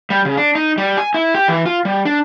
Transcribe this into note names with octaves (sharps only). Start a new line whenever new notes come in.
G3
C#3
D4
D#4
G3
G#5
E4
G4
E3
F4
G3
D4